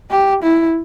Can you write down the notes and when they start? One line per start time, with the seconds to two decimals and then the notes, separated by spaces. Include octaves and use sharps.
0.10 G4
0.43 E4